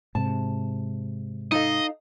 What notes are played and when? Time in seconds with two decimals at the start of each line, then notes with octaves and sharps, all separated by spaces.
0.15 G#2 C3 A5
1.52 D#4 A4 D#5 F5